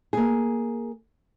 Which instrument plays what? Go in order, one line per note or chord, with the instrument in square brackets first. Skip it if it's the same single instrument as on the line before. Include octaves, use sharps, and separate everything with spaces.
[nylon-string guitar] A#3 G#4